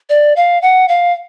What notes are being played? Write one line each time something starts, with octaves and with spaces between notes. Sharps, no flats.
D5
F5
F#5
F5